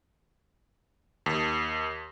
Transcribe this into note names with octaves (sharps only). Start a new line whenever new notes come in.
D#2